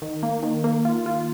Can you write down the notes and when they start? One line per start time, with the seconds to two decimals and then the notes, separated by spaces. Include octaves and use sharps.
0.02 D#3
0.23 A#3
0.43 D#3
0.64 A#3
0.85 F4
1.06 F4